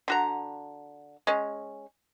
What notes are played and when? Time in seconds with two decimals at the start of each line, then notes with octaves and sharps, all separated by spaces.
0.08 D3 F#4 A#5
1.27 G#3 C#4